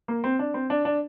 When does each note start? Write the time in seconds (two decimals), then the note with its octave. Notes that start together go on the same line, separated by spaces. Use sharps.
0.08 A#3
0.24 C4
0.39 D4
0.54 C4
0.70 D4
0.85 D4